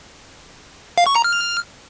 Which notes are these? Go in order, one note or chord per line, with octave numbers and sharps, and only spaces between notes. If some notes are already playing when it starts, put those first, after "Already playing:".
F5
C#6
A#5
F6